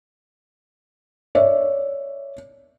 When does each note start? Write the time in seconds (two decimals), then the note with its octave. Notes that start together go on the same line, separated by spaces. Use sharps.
1.35 C#5 D5 E5